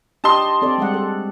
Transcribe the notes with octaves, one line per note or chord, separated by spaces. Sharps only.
D4 G4 D#5 A5 C6
C4 A4 D5
G3 G#3 F#5
A4